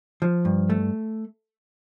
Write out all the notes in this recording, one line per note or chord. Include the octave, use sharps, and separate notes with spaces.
F3
G2
A3